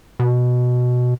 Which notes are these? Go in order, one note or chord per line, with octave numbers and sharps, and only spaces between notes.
B2